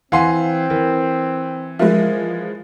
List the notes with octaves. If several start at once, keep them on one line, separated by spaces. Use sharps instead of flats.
E3 C4 F5 F#5 G#5 C6 C7
E3 A#4
F3 G#3 A#4 B4 E5